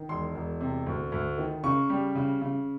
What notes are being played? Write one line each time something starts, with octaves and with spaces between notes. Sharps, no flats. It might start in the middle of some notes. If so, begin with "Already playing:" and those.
Already playing: D#3
E1 C6
E1
C3
D2
D2
D#3
C#3 C#6
G3
C#3
C#3